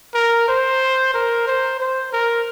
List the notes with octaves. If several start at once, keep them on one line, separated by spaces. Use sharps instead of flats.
A#4
C5
A#4
C5
C5
A#4